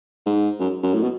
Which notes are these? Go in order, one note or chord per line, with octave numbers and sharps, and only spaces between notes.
G#2
F#2
F#2
A2
B2